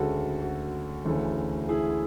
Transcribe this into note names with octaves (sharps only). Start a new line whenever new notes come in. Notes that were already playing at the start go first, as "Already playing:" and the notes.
Already playing: D2 C#3 G#3 F#4 A4
F#4
D2 C#3 E3 A3
E4 G#4